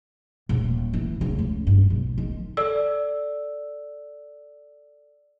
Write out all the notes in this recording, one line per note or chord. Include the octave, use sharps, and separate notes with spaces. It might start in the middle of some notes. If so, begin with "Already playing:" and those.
D#1
E3
C#3
C#2
G2
B1
D#3
A4 D5 E6